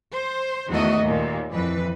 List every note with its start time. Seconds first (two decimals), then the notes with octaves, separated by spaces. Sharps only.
0.12 C5
0.68 E2 D#3 A3 F#4 D#5
1.03 D#2 A#2
1.52 F2 E3 B4